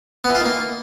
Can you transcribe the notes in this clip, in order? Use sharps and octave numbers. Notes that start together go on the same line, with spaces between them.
B3
E3
F4
D#3
A#3